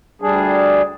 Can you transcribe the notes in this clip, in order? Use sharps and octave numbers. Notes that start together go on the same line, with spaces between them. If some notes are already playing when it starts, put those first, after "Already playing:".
D2 G3 D4 G#4